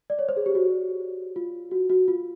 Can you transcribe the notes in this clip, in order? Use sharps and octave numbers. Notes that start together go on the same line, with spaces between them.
D5
C#5
C5
G#4
G4
F#4
F4
F#4
F#4
F4